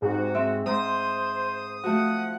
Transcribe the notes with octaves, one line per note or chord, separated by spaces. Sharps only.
G#2 C3 F#4
C4 E5
G#2 C5 D#6
F3 A3 F#4 F#5